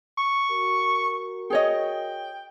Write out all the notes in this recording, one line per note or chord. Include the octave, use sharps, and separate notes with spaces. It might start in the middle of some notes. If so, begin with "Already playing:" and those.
C#6
F#4 A#4
G#4 C#5 D#5 G5